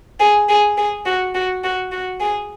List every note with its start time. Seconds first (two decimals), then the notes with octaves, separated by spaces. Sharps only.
0.20 G#4
0.49 G#4
0.77 G#4
1.06 F#4
1.35 F#4
1.64 F#4
1.92 F#4
2.20 G#4